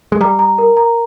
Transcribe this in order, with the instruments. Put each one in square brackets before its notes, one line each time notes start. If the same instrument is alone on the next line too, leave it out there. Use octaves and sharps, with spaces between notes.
[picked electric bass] G#3
[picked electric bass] G3 [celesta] A#5
[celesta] A#5
A#4
A#5